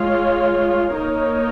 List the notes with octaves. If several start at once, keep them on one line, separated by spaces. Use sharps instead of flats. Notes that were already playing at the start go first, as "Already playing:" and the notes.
Already playing: G#3 F4 C#5
A#3 D#4 A#4 C#5